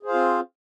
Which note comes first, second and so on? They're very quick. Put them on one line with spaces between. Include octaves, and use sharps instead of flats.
G#4 C5 F5 F4 C4